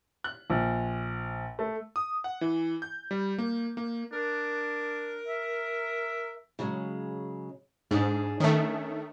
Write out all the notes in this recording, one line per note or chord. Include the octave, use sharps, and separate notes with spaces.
F#6
A#1
A3
D#6
F#5
E3
G6
G3
A#3
A#3
D4 A#4
E5
C#3 F#3 G#3
G#2 D4 G#4
D#3 A3 C#4